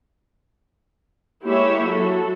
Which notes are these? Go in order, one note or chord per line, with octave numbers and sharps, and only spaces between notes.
G#3 A#3 E4 G4 C#5 E5
F#3 F#4 A4